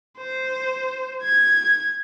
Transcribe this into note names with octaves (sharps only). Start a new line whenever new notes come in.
C5
G#6